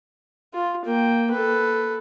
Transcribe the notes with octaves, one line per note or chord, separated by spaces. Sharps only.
F4
A#3 G5
A4 B4